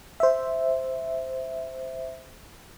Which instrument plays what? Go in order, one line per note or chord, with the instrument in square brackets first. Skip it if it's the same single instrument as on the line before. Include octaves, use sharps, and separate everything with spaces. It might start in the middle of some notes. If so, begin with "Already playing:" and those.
[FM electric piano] C5 E5